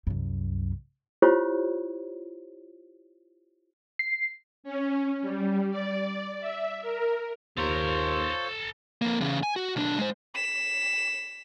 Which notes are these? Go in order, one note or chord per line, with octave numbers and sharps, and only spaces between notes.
C2 F#2
E4 F4 G4 C5 C#5
C7
C#4
G3
D5
E5
A#4
D#2 F4 A4 C5 C#5 A#5
F2 A#3
E2 C#3
G#5
F#4
B1 D4
G#3 C5
B6 E7